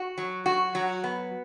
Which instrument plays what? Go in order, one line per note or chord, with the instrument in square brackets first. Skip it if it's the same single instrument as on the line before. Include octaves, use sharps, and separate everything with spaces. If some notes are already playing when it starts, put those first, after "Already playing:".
Already playing: [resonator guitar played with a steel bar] F#4
F#3
F#4
F#3
B3